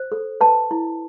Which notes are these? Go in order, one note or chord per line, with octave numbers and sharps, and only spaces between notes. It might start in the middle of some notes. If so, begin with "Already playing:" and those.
Already playing: C5
A4
B4 A5
E4